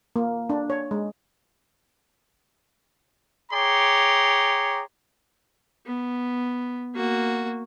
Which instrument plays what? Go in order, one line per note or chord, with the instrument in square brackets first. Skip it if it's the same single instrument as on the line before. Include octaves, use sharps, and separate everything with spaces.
[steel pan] A#3
D4
C#5
G#3
[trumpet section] G#4 C#5 G5 A#5 C6 D6
[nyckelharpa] B3
A#3 F#4